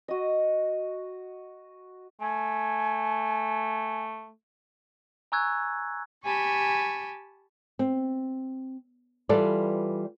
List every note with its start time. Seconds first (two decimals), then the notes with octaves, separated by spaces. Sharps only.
0.08 F#4 D#5
2.21 A3 G#5
5.32 G#5 A#5 C#6 E6 F#6 G#6
6.23 G4 G#5 A5 B5 C#6
7.79 C4
9.29 E3 G3 F4 A4 B4 D5